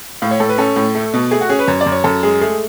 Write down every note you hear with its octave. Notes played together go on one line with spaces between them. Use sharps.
A2 F5
C#5
A2 A4
B4
C#4 A4
A2
A3
B2
A3 G#4
F#4
C#4 G#4
B4
F#2 C#5
D5
F#2
C#5
F#2 A4
G#3 G#4
A3 G#4